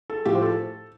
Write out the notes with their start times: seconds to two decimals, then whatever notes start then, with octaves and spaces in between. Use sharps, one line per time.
0.10 A4
0.25 A2 F3 G4
0.35 C5
0.42 A4